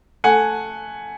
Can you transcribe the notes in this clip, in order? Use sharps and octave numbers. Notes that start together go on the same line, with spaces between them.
A3 F#5 G#5